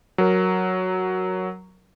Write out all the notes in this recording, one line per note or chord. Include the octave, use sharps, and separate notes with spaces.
F#3 A#4